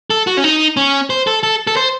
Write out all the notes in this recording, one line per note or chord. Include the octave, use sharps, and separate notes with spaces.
A4
F#4
C#4
D#4
C#4
C5
A4
A4
A4
C5